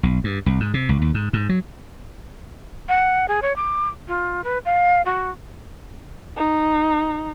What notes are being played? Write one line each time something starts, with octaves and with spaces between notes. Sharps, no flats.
B1
G2
C2
G#2
C3
C#2
D#2
G#2
G#2
F#3
F#5
G#4
C#5
D6
F4
B4
F5
F#4
D#4